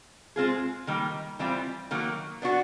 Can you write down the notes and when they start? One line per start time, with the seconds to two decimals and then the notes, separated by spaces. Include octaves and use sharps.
0.36 G#3 C4 F4 G#4
0.87 D#3 G3 A#3
1.39 E3 G3 C4 F4
1.91 D#3 F#3 A#3
2.42 B3 D4 F#4